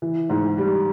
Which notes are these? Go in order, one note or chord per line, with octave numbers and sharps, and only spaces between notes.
E3
G#2
G3